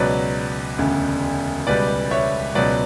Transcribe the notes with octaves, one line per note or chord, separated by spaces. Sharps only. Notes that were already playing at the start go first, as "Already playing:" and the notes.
Already playing: C#2 B2 F#3 B4 D5
E1 D2 C#3
C#2 B2 G3 B4 D5
C#5 E5
C#2 B2 F#3 B4 D5